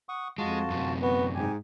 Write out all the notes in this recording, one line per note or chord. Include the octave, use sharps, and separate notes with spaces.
F#5 C#6 D#6
F2 G#3 F4 F#4 A5
F#2 C3
B3 F#4
G#2 G4 G#5